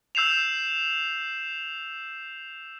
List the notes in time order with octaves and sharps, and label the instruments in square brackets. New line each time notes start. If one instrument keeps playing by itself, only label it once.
[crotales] E6 G6 C7 E7 F7